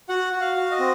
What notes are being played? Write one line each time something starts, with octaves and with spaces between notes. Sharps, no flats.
F#4 F#5
F#4
F5
F#4
D#5
C4